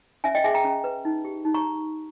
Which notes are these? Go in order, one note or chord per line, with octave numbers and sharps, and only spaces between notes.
C#4 E5 G#5
D#5 G5
G#4 E5 G#5
G5 A#5
C#4
B4
D#4
G4
D#4
A#5 C#6